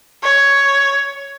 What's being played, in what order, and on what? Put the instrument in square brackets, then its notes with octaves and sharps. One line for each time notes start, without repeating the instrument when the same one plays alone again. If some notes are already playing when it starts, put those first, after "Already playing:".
[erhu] C#5